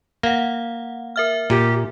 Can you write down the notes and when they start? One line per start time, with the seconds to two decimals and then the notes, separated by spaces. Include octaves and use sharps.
0.23 A#3 F5 F#5
1.16 A#4 E5 F6
1.50 A#2 G4